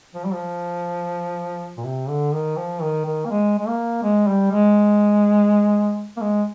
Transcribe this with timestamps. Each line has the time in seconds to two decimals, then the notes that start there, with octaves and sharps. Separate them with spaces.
0.14 F3
0.24 G3
0.34 F3
1.77 A#2
1.84 C3
2.09 D3
2.33 D#3
2.57 F3
2.81 D#3
3.06 D#3
3.25 A#3
3.30 G#3
3.58 G#3
3.67 A#3
4.03 G#3
4.27 G3
4.51 G#3
6.17 A#3
6.21 G#3